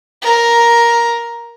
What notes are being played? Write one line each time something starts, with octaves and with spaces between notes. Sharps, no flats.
A#4